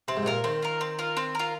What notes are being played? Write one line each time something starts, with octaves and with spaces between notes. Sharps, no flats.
C3 C4
G#2
C3
A#2 F4 A#4
D#3 C4
F4 A#4
C4
F4 A#4
C4
F4 A#4